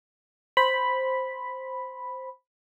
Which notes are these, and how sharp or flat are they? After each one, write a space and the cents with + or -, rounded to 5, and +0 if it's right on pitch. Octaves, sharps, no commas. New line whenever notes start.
C5 +0 B5 +0